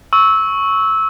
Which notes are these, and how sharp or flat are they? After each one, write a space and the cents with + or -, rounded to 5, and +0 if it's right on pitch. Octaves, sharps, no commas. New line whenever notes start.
C#6 +0 E6 -15